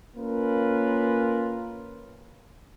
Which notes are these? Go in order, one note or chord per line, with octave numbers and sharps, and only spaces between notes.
A#3 C#4 F4 A#4 B4